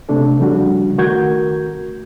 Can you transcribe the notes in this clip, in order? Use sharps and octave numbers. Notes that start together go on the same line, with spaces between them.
C3 A3 D4 A4
C#3 F3 G3 D4 F#4
D#3 A3 F#4 A#4 G6 G#6